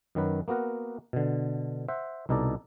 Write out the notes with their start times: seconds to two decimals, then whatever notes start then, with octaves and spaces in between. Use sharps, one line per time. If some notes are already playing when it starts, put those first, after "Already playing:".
0.15 F#2 D#3 F#3 B4
0.48 A#3 B3 F#4 A#4 F#5
1.13 B2 D3
1.88 C5 E5 F#5
2.29 C2 B2 D#4 A4 D5 A#5